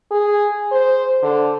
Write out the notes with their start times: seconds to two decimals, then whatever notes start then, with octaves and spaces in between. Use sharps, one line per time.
0.11 G#4
0.72 C5
1.23 D3